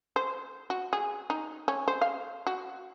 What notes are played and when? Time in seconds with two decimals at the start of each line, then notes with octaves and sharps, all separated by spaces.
0.16 C5
0.70 F#4
0.93 G#4
1.30 D#4
1.68 C#4
1.88 C5
2.01 F5
2.47 F#4